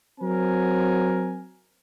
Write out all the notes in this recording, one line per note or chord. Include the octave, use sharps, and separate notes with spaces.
F#3 C4 A#4 G#5